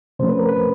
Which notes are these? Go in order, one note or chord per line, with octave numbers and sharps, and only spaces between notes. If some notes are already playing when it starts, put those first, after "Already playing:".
C3 F3 A3 C#4 C5
B4
A#4
B4